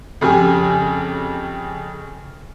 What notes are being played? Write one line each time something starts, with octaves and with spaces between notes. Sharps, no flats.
F2 C#3 G4 G#5